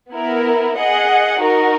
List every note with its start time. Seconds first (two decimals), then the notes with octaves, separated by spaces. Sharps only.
0.11 B3 E4 A#4
0.76 G#4 D#5 F#5
1.40 D#4 F#4 A#4